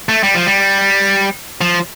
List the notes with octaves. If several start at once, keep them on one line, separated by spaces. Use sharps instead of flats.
A3
G3
F3
G3
F3